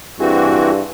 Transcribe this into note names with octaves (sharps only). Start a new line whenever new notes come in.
G2 E3 C4 E4 F#4 G#4